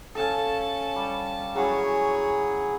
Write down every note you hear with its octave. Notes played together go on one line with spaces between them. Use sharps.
C#4 A4 F5 G#5 A5
G3
F#3 C#4 E4 G#4 C#5